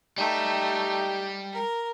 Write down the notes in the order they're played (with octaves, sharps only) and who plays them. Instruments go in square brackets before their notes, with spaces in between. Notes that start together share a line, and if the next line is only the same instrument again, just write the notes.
[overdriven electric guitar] G3 [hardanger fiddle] A3 D#4 [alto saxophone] G4
[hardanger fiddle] A#4